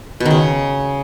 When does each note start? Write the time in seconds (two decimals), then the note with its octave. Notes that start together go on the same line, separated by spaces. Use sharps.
0.20 B2
0.26 D#3
0.31 C#3